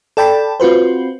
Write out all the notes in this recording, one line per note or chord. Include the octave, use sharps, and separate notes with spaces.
A4 D5 G5 A5 B5
C4 F4 F#4 B4 C5